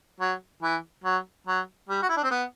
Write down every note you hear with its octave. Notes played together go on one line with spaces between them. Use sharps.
F#3
E3
F#3
F#3
G3
F#4
E4
D4
C4
B3